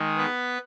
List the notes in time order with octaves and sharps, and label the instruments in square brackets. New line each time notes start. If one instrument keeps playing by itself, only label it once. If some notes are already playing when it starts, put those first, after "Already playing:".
Already playing: [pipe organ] D#3 G#3
B3 B4